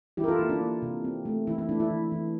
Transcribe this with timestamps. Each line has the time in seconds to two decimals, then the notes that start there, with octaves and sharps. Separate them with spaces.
0.17 E3 E4 G4
0.24 A#4
0.28 F4 A4
0.39 A#3 E4
0.50 D4
0.61 A#3
0.82 C3
1.05 C4
1.25 A3
1.47 E3 E4
1.58 E4
1.69 A3 D4
1.80 E4
1.91 E3
2.12 E3